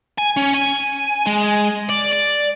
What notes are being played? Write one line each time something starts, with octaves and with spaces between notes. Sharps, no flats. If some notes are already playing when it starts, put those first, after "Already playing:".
G#5
C#4
G#5
G#3
D5
D5